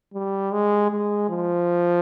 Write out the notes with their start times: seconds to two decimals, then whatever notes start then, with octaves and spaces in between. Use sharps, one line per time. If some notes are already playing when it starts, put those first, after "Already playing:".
0.14 G3
0.52 G#3
0.90 G#3
1.29 F3